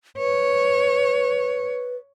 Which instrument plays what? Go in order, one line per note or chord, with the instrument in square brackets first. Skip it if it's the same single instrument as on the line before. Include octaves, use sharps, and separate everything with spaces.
[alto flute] B4 [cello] C#5